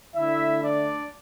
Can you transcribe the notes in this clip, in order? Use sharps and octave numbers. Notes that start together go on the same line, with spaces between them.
D3 A3 D4 E4 E5
D4 D5